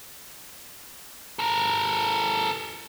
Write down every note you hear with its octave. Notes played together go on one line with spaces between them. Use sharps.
A4 A#4